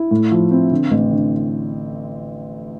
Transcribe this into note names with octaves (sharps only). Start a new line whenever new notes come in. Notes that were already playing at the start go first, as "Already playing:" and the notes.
Already playing: E4
A2
F3
C4
D3
A1
D3